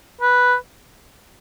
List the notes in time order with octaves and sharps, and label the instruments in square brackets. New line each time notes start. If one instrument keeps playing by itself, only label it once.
[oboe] B4